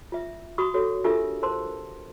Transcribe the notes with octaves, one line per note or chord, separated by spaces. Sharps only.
F4 E5
F#4 B5 C#6 D#6
F#4 A4 C#5
D4 F4 G4 A4 A#4 E5
A#4 C5 A5 C6